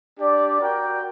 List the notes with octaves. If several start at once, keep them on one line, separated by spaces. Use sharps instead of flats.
D4 G4 D5
F#4 A#4 D5 G5